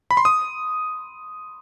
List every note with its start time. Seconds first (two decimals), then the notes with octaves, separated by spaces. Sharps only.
0.11 B5
0.17 C6
0.25 D#6